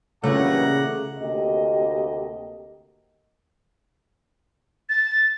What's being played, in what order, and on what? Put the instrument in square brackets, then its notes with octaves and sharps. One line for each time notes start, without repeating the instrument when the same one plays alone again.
[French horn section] G2 A#2 E3 [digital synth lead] C#3 [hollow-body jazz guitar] A3 [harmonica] F#5 A#5 D6
[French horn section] D2 C3 A#3 G4 D#5
[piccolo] A6